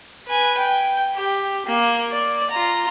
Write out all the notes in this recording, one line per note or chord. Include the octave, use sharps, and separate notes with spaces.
B4 G#5
G5
G4
A#3
D5
F4 A#5